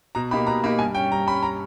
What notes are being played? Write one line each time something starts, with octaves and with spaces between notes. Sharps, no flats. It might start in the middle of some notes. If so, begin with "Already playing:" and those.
B2 A#5
A#3 D#4 G4 B5
B2 A#5
A#3 D#4 G4 B5
G2 G#5
G3 C#4 G5
G2 A#5
G3 C#4 B5
A#5